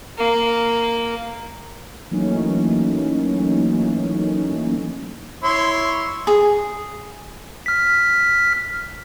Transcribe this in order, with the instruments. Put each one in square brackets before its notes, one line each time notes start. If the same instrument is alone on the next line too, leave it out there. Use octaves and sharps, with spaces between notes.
[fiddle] A#3
[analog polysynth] E3 F#3 A3 A#3 C#4 D#4
[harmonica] E4 C#5 C6
[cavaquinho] G#4
[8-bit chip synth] F6 B6